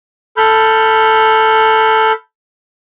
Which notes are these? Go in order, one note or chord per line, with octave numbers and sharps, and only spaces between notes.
A4 B5 F6 G6